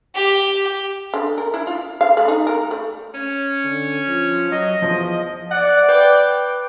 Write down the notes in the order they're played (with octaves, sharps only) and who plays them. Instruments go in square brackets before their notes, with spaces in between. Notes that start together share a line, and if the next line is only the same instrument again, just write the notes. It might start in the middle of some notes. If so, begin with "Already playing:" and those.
[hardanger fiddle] G4
[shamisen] D3
A#4
E4
F4
F5
A3
D#4
A#4
A3
[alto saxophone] C#4
[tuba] D3
F3
[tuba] F#3 [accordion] D#5
[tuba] E2 [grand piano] F3
[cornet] D5 [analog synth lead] F#5
[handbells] B4 D6 [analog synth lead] G5